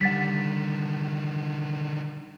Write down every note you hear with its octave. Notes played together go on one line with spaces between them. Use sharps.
D3 D#3 G3 F#5 A6 B6